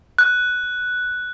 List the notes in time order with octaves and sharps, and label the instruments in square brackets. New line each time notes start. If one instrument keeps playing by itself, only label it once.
[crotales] F#6